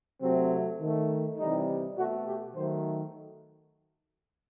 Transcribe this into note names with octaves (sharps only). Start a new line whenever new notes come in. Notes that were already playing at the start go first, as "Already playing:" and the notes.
C3 F#3 A3 C4
D#3 A3
C3 E3 G3 D#4
B2 A3 F#4
G4
D#3 F#3 A3 C5